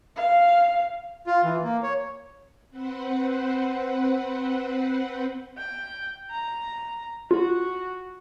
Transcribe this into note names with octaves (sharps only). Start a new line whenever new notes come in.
F5
F4
E3
A#3
C#5
C4 B4 C5 F#5
G5
A#5
F4 F#4